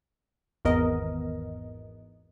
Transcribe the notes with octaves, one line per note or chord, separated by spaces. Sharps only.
G#1 E2 B3 A#4 D#5